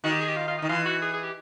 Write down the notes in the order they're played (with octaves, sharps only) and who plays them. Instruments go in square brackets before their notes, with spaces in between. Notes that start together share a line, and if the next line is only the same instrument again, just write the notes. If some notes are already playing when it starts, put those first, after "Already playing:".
[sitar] D#3 [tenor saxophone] F#4
[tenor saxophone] G4
G#4
G4
F4
F4
D#4
[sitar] D#3
[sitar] E3 [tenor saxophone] F4
[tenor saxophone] F#4
G#4
G#4
G4